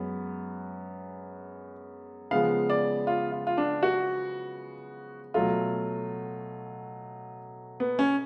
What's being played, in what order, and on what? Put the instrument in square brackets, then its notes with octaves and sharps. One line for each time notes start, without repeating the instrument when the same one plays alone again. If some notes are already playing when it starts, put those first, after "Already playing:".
Already playing: [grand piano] F#2 G#3 B3
[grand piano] C#3 F3 G#3 B3 [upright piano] F5
[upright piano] D5
F4
F4
F4
D4
F#4
[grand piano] B2 F#3 A3 [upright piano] F4
[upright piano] B3
C#4